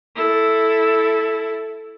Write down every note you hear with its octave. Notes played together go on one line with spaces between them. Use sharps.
E4 A4